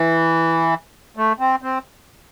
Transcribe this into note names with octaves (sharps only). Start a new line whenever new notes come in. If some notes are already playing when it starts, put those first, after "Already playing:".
Already playing: E3
A3
C4
C4